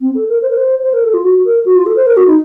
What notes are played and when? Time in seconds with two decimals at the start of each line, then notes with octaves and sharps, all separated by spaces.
0.01 C4
0.14 A4
0.28 A#4
0.42 C5
0.49 A#4
0.57 C5
0.83 C5
0.93 A#4
1.03 A4
1.13 F4
1.24 F#4
1.44 A#4
1.65 F#4
1.75 F4
1.86 A4
1.96 C5
2.06 A#4
2.16 F#4
2.27 D#4